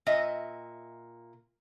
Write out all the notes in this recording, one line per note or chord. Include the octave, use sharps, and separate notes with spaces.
A#2 D#5 E5